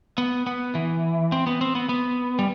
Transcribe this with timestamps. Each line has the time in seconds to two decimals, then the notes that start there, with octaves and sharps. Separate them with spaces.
0.18 B3
0.47 B3
0.75 E3
1.32 C4
1.47 B3
1.61 C4
1.75 B3
1.89 B3
2.39 G3